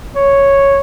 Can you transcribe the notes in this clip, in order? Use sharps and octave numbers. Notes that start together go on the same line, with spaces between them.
C#5